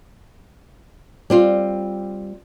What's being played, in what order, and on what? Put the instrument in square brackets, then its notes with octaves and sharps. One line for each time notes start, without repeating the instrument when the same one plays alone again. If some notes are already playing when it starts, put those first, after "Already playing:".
[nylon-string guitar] G3 C4 F4